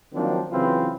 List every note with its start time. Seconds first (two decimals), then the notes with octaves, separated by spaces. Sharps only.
0.14 D#3 F3 F#3 A#3 C4 D4
0.51 C#3 E3 F#3 C4 F4 B4